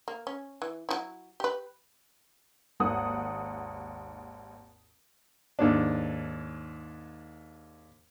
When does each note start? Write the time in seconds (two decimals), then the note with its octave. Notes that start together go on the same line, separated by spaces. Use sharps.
0.08 A#3
0.27 C#4
0.62 E3
0.89 F#3 D#4 E4
1.40 G4 B4
2.80 G#1 D#2 F#5 D#6
5.59 D#2 G#2 D4